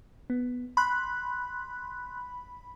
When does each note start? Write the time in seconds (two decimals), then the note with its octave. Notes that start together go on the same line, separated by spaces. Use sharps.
0.30 B3
0.77 B5 C6 F#6